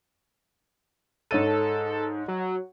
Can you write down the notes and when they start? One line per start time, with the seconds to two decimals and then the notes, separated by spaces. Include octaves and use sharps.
1.31 G#2 A4 C#5 D#7
2.28 F#3